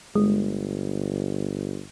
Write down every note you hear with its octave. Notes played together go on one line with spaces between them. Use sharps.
G1 G#3